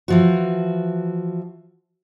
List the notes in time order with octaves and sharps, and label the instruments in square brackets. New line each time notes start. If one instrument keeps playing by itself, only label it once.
[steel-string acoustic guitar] E3 F3 F#4